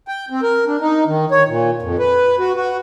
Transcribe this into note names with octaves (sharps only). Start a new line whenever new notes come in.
G5
C4
A#4
D4
D#4
D#3
C#5
A#2
F2
B4
F#4
F#4